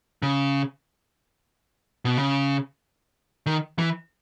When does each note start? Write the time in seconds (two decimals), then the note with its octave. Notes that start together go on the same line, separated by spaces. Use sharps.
0.22 C#3
2.05 B2
2.17 C#3
3.46 D#3
3.79 E3